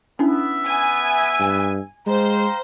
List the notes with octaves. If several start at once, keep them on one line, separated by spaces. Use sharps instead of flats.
B3 C#4 D4 E4 E5
G#5
G2
G#3 C5 F5 G5 A#5